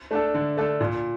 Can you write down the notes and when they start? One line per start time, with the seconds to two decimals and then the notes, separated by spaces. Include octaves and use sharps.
0.11 A3 D4 A4
0.34 D3
0.57 A3 D4 A4
0.81 A#2